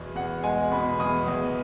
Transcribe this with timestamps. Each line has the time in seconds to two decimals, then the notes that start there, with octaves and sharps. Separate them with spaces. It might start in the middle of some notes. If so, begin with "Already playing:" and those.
Already playing: E2 B2
0.16 E2 F#5
0.43 G#3 G#5
0.71 B2 B5
0.99 E2 D#6
1.28 E2